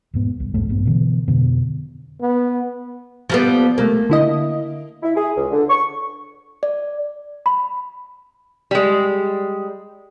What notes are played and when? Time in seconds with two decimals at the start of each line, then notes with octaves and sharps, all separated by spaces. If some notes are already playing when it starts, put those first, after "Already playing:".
0.14 E1 G#2 B3
0.40 C2
0.54 A#1 E2 G#2 A3
0.69 E1 A#1 G2 B3
0.85 B2 D3 E3
1.27 F2 B2 D3
2.21 B3
3.30 F3 G3 B3
3.78 C2 A3 A#3
4.10 D3 E4 D#5
5.03 E4
5.15 G#4
5.37 C#2
5.51 D3
5.70 C#6
6.63 D5
7.46 B5
8.71 G3 G#3